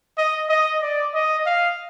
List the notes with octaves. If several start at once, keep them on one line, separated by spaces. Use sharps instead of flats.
D#5
D#5
D5
D#5
F5